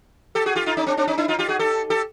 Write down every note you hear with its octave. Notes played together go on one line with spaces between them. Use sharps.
G4 A4
F#4 G#4
F4 G4
D#4 F4
C#4 D#4
C4 D4
C4 D4
C#4 D#4
D4 E4
D#4 F4
F4 G4
F#4 G#4
G4 A4
G4 A4